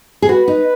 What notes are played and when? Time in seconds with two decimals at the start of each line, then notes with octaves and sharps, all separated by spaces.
0.22 G#4
0.29 F#4 B4
0.48 D#4